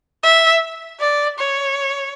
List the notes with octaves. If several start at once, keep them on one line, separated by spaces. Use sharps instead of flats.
E5
D5
C#5